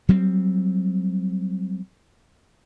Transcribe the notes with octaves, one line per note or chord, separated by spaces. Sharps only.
F#3 G3 C4